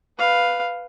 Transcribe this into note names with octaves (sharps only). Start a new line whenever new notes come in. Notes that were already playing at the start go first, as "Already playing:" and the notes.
B4 F5